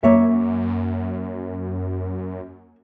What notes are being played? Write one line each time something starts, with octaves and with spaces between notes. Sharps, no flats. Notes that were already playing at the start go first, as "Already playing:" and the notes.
F#2 A#3 C#5 E5